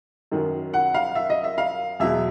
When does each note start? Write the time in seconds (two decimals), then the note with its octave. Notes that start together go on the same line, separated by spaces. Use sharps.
0.32 F#2 D#3 F#3
0.74 F#5
0.94 F5
1.15 E5
1.30 D#5
1.44 E5
1.58 F5
2.00 E2 B2 F#3 E5